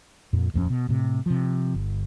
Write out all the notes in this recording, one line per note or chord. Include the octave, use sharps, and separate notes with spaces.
F2 A#2
D#1 F2 G#3 C#4
B2
A2 C3
C3 F3
G1